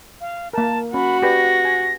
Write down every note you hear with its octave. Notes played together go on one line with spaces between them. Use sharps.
F5
A#3 A#4 A5
C#4 F#4 B5
G4 B4 D5 A#6
G#5